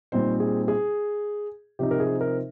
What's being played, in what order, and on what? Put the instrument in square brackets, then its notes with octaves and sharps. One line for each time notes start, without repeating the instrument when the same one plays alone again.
[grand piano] A#2 G3 C4 D#4 C5
G#4
G#4
C3 F3 C4 D#4 G4
A#4
G#4
A#4